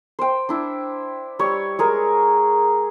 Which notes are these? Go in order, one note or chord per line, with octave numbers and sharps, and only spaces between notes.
C5 G5
D4 E4
G3 C#5
G#3 G#4 A#4